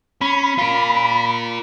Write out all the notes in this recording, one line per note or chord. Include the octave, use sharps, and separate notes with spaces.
C#4 B5
F4 A#4